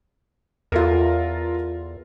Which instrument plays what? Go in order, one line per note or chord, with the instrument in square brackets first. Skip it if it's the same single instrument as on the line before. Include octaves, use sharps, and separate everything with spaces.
[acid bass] E2 [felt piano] F4 A4 A#4